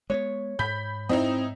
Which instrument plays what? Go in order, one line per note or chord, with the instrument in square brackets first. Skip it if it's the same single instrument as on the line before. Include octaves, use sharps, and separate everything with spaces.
[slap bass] G#3 A#3 B3 [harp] C#5
[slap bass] G#2 [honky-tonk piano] B5 G6 B6
[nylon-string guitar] C4 [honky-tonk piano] D#4 E4 D#5